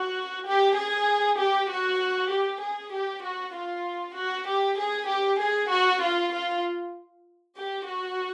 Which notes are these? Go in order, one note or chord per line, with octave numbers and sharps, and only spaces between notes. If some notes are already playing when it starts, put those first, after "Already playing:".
Already playing: F#4
G4
G#4
G4
F#4
G4
G#4
G4
F#4
F4
F#4
G4
G#4
G4
G#4
F#4
F4
F4
G4
F#4